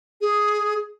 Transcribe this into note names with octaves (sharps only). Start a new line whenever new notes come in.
G#4